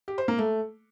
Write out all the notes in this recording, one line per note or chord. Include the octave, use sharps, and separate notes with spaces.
G4
C5
A#3
A3